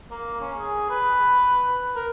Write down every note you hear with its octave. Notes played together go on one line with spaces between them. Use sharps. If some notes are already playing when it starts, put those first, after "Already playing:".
A#3
C#4
G#4
B4
A#4